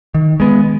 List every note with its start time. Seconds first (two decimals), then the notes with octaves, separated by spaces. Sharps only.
0.14 D#3
0.40 G#3 B3